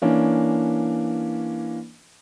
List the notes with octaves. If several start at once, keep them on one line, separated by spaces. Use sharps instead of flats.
E3 A#3 C#4 D4